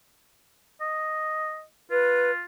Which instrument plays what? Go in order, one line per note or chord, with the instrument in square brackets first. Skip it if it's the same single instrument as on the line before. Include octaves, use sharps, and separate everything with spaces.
[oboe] D#5
[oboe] F4 [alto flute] B4